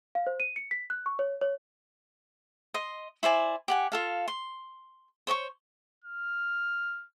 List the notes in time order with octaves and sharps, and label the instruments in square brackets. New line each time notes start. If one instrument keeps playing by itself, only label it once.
[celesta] F5
C5
D#7
C#7
B6
F#6
C#6
C#5
C#5
[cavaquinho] D#5 C6
E4 C5 D5 G#5
G4 F#5 G#5
F4 A4 F5
C6
C5 C#5 D#5 C#6
[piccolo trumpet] F6